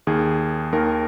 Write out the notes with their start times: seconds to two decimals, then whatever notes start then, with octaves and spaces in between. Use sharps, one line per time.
0.07 D#2 D#3 G#4
0.72 D#2 D#3 A#4